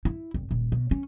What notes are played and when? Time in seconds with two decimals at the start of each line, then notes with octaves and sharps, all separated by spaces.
0.05 E4
0.34 F1
0.51 D#1
0.72 B2
0.91 C#4